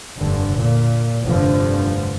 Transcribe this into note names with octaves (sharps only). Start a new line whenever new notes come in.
F1 G2 D3
A#2
F1 G2 D3 F3